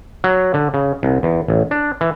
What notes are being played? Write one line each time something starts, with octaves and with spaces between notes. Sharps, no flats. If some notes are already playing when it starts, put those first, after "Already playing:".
F#3
D3
C#3
C2
E2
A1
D4
E3